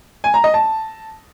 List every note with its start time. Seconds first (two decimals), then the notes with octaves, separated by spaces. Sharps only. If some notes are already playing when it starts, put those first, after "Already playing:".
0.24 G#5
0.34 A#5
0.44 D#5
0.54 A5